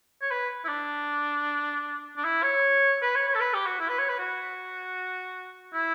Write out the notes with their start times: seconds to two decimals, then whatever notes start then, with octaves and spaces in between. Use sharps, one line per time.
0.22 C#5
0.31 B4
0.65 E4
0.68 D4
2.17 D4
2.24 E4
2.43 C#5
3.02 B4
3.16 C#5
3.28 C#5
3.35 A4
3.40 B4
3.54 G4
3.66 F#4
3.80 E4
3.89 B4
3.99 C#5
4.09 B4
4.19 F#4
5.74 E4